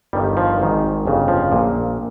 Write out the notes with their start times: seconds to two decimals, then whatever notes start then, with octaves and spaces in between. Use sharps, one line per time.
0.13 G1 G2 D#3 G3
0.37 F3
0.60 G#1 G#2 D#3
1.06 G1 F2 C#3
1.28 F3
1.52 A#1 A#2